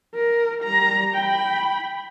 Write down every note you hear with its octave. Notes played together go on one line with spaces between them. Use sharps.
A#4
G3 A#5
G5 B5